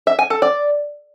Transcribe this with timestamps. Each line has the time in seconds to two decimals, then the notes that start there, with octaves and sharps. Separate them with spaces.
0.07 E5
0.19 G#5
0.30 A4
0.42 D5